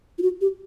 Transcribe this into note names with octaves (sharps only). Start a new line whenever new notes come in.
F4
F#4
G4